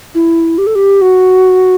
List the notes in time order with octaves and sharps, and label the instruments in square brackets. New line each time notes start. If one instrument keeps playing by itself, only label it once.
[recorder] E4
G4
A4
G4
F#4